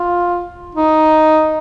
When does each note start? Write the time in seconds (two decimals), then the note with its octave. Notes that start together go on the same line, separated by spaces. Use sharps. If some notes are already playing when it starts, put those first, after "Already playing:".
Already playing: F4
0.75 D#4